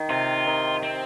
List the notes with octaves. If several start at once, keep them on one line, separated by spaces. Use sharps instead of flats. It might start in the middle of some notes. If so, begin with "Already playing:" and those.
Already playing: D#3
C3 F4
D#3
C4